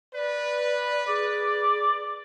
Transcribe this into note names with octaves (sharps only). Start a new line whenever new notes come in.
B4 D5
G#4 D5